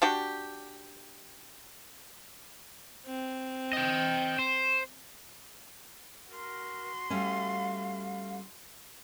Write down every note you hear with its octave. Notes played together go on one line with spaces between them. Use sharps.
D4 F#4 G4
C4
D#5 G5
C5
F#4 A#4 C6
G3 A3 C#4 F5